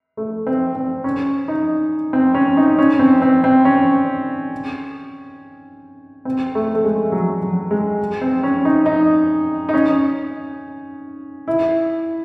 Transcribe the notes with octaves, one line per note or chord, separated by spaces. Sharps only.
A3
C4
C4
C#4
D#4
C4
C#4
D#4
C#4
C4
C4
C4
C#4
C4
A3
A3
G#3
F#3
F#3
G#3
C4
C#4
D#4
D#4
D#4
C#4
E4